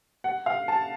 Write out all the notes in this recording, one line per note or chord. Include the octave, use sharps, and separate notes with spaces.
F#5
F5
A5